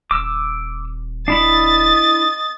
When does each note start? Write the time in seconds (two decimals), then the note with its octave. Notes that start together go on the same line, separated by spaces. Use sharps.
0.11 D#1 D6 E6
1.28 D4 E4 D#5 B5 A6